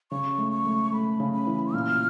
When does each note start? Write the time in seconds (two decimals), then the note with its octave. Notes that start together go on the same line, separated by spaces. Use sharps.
0.11 C#3 C#6
0.38 A3
0.52 C#6
0.66 A3
0.92 A3 B5
1.20 C#3
1.33 B5
1.47 E3
1.74 A#2 F6